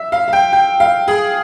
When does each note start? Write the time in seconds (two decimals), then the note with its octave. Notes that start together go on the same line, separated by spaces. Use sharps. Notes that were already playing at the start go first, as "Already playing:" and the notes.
Already playing: E5
0.12 F5
0.28 F5
0.33 G5
0.53 G5
0.80 F5
1.08 G#4